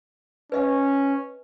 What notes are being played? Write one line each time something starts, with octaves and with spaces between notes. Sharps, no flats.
C#4 B4 D#5 F5